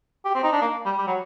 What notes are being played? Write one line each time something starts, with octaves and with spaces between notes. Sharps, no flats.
G4
C4
D#4
D4
A#3
G3
G3
F#3